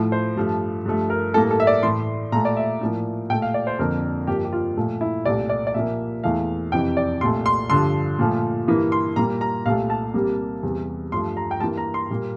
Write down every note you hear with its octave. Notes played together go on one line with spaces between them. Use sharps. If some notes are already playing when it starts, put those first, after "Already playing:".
Already playing: A2 F3 A3
C5
G2 F3 A3
G2 F3 A3
A#4
A2 G3 A#3 A4
A4
E5
D5
A2 E3 A3 C6
A#2 A3 A#5
D5
E5
A2 F3 A#3
A#2 A3 G5
F5
D5
C5
F2 D3 F3 A#3 A#4
G2 F3 A#3 G4
G4
F4
A#2 F3 A3
E4
C2 A#2 A3 D5
D5
D5
A#2 F3 A#3 E5
E2 E3 A3 F5
F2 C3 E3 G5
D5
C2 A#2 A3 C6
C6
G2 D3 F3 C6
A#2 F3 A3
G2 E3 A#3
C6
A#2 G3 A#3 A#5
A#5
C2 A#2 A3 F5
A5
C2 C3 G3 A#3
E2 C3 G3
G2 F3 A3 C6
A#5
G5
G2 E3 A#3 A5
A#5
C6
A#2 G3 A#3